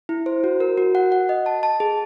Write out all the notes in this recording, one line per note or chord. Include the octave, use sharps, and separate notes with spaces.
E4
C5
F#4
A#4
F#4
F#5
F#5
D#5
A5
A5
G#4